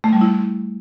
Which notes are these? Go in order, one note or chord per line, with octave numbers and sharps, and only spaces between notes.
A3
G3
E4